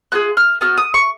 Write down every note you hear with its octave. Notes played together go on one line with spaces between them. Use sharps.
A#3 F4 G#4 F#6
F6
B3 F#4 F6
D#6
C#6